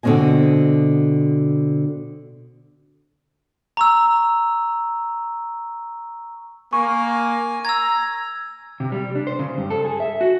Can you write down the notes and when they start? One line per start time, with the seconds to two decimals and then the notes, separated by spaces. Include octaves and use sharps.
0.03 B2 D3 A#3 C4 D#5 G#5
3.77 A#5 C#6 E6
6.73 A#3 G#5 C#6
7.65 A#5 E6 G#6
8.80 C3
8.92 G3
9.15 D4
9.27 C5
9.39 C#3
9.58 G2
9.70 A4
9.85 G#4
10.00 E5
10.21 F#4